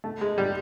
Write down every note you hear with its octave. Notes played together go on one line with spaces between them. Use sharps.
A3
G#3
G3